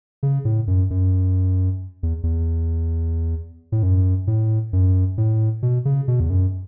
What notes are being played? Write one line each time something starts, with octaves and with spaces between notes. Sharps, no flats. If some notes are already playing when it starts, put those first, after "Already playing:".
C#3
A2
F#2
F#2
E2
E2
A2
F#2
A2
F#2
A2
B2
C#3
B2
E2
F#2